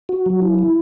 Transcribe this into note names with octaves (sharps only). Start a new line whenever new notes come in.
F#4
F#3
E4
E4